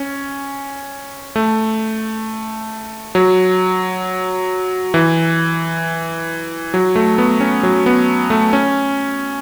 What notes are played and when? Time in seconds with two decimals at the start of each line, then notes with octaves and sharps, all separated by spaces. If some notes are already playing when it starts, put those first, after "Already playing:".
Already playing: C#4
1.36 A3
3.15 F#3
4.94 E3
6.74 F#3
6.96 A3
7.18 B3
7.40 C#4
7.63 F#3
7.86 B3
8.30 A3
8.53 C#4